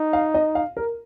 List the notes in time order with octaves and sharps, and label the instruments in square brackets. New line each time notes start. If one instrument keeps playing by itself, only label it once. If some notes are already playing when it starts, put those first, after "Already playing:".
Already playing: [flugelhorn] D#4
[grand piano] F5
D#5
F5
A#4